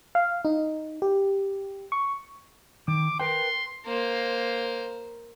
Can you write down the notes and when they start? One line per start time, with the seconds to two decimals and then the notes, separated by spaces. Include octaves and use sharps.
0.15 F5
0.45 D#4
1.02 G4
1.92 C#6
2.88 D#3 D6
3.20 A#4 B4 G5 C6
3.86 A#3 C5